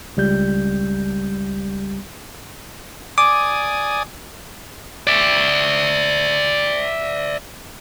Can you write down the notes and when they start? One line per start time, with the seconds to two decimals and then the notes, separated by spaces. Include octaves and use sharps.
0.17 C#2 G3 G6
3.18 D5 G#5 D6 D#6
5.07 D5 E5